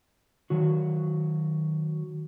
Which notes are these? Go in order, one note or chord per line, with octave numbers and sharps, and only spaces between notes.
D#3 F#3 F#4